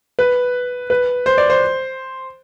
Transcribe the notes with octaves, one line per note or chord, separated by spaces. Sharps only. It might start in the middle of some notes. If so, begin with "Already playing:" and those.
B4
B4
C5
D5
C5